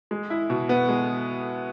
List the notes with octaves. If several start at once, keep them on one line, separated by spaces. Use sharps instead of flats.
G#3
E4
B2
B3
G#3